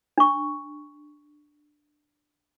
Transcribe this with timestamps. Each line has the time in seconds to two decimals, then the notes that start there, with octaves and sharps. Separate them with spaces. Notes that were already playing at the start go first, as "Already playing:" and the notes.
0.18 D4 C#6